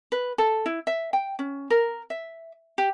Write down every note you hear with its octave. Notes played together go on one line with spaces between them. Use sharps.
B4
A4
E4
E5
G5
C#4
A#4
E5
G4